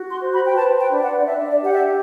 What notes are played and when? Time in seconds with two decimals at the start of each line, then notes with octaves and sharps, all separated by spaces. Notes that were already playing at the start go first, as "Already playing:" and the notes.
Already playing: F#4
0.09 C6
0.21 C5
0.32 B5
0.45 G5
0.56 B4 A5
0.79 G5
0.91 D4
1.02 F#5
1.19 D5
1.26 D4 E5
1.49 D5
1.61 G4 F#5
1.73 E5